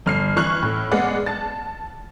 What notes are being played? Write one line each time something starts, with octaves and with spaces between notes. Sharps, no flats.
G1 F6 C7
E3 C#6 F6 F#6 F#7
A2
G#3 B3 G#4 D5 F#5
A5 A6